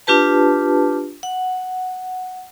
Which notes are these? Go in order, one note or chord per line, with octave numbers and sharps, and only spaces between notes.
D4 F4 G4 B4 A5
F#5